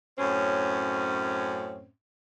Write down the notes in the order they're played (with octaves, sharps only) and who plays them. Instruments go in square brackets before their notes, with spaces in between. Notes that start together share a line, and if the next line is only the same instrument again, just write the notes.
[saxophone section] F#2 A2 C4 C#4